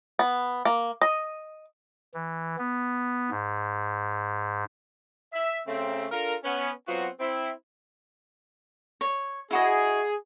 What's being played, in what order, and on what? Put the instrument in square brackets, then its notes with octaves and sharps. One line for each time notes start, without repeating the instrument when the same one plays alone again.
[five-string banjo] B3
A#3
D#5
[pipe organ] E3
B3
G#2
[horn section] E5
C#3 A3 C4
D4 F4 A4 A#4
B3 C#4
F#3 B3 C4 F4 F#4
C4 E4
[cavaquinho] C#5
[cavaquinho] E4 F#4 D#5 [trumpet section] G#4